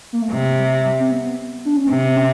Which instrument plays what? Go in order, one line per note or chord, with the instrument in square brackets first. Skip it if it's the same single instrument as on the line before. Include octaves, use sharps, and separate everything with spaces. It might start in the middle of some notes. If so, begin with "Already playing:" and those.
[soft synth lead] A#3
A3
[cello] C3 [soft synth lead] G#3
[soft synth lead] G3
G3
C4
B3
D4
C#4
[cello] C3 [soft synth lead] C4
[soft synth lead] C4
C#4